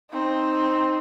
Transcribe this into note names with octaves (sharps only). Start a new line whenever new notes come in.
C4 D#4